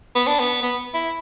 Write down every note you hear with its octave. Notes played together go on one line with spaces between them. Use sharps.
B3
D4
B3
B3
E4